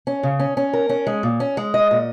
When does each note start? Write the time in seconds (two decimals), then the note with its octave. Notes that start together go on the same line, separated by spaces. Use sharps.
0.07 C#4
0.23 C#3
0.40 C#4
0.57 C#4
0.73 A#4
0.89 C#4
1.07 G#3
1.23 A#2
1.40 C#4
1.57 G#3
1.74 D#5
1.91 A#2